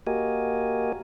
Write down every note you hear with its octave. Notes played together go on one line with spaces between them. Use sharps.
A#3 F#4 G4 A#4 D#5 G#5